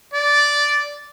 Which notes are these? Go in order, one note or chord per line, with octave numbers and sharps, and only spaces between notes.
D5